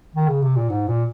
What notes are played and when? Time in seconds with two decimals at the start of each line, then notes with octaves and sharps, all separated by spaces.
0.15 D#3
0.28 C#3
0.42 C3
0.56 A#2
0.69 G#2
0.88 A#2